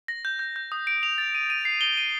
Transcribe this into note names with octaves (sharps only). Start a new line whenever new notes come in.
A#6
G6
G6
G6
D#6
D7
F7
A6
D#7
D#7
C7
G7
D#7